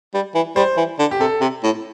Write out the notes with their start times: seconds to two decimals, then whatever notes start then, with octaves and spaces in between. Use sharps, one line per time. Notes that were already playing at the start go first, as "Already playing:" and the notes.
0.14 G3
0.35 E3
0.56 G3 C5
0.77 E3
0.99 D3
1.11 G4
1.20 C3 A4
1.41 C3
1.63 A2